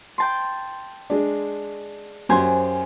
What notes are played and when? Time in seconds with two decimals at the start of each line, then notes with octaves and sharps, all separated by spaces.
0.18 G5 A5 C6
1.10 G#3 D4
2.29 F#2 G4 C5 G#5 C6